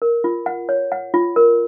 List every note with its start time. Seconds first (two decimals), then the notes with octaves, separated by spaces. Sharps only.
0.02 A#4
0.24 F4
0.46 F#5
0.69 C#5
0.92 F#5
1.14 F4
1.36 A#4